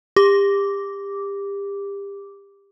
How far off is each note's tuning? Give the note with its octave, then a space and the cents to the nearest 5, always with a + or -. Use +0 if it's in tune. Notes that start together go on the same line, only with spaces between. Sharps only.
G4 +30 D6 -10